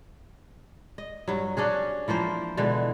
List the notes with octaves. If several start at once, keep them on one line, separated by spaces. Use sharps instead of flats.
D#5
G2 F#3
C#4 D4 F#4 G#4
E3 F3 A#3 C5
B2 D3 E3 G#3